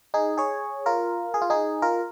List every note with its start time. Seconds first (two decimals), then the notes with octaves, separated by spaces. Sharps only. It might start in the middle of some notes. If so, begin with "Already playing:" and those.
0.14 D#4 G#4
0.38 G#4 C#5
0.86 F4 A#4
1.34 G#4
1.42 F4
1.50 D#4 G#4
1.82 F4 A#4